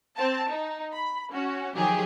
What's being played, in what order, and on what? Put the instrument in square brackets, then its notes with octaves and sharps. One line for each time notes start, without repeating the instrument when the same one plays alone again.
[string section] C4 A5
D#4
B5
C#4 F#4
D#3 F3 F#3 G4 G#4